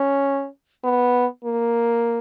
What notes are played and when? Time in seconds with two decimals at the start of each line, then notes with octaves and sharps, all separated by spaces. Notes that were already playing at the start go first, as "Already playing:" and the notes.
Already playing: C#4
0.84 B3
1.44 A#3